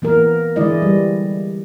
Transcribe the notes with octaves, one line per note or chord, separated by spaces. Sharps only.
E3 A#3 B3 A#4
D3 E3 G#3 E4 D5 D#5
G3